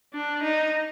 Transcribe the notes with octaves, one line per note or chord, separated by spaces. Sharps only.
D4
D#4